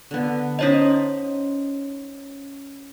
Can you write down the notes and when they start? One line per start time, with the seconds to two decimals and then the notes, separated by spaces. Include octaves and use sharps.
0.11 D3 B3
0.59 C#4 D#4 C5 C#5 D#5 A5